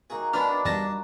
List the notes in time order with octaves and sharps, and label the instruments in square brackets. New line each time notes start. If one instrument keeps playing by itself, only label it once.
[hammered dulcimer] D#3 A#3 F#4 [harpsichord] G#4
[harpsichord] E3 B3 [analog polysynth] D4 [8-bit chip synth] F6
[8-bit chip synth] E2 A5 A#6 [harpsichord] G3